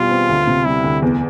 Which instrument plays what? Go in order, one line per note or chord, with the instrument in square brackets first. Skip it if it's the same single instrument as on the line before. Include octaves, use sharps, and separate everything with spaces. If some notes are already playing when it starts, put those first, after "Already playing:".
Already playing: [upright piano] E2 B2 G3 [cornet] F4
[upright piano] C4
D2
C3
[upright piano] G3 [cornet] E4
[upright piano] D2
E2